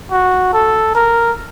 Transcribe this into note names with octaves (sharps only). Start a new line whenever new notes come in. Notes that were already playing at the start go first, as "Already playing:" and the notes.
F#4
A4
A#4